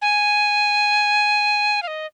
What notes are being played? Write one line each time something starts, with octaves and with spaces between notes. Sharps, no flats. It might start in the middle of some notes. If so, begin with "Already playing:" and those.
G#5
F5
D#5